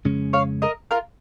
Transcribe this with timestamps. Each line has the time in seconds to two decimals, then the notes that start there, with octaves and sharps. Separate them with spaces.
0.05 F2 C#3 G#3 C#4
0.33 C#5 F5
0.62 A#4 D#5
0.91 F4 A#4